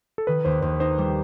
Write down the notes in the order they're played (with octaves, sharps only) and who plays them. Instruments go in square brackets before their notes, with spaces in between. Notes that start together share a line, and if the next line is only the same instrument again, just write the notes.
[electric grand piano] A4
[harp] D#3 [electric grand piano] B4
[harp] D#2 [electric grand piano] C5
[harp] D#2 [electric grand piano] C5
[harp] D#4 [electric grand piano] C5
[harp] G3